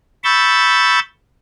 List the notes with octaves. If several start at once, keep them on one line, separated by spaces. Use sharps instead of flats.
B5 C#6 E6 G6 A6